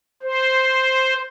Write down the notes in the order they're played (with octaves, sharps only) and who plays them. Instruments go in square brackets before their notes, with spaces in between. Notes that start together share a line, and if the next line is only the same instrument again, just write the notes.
[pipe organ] C5